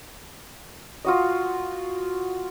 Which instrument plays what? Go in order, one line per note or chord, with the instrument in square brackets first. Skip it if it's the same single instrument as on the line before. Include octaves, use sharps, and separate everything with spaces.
[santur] F4 F#4 D#5